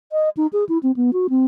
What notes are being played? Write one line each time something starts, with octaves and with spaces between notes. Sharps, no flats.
D#5
D#4
G#4
E4
C4
B3
F#4
C4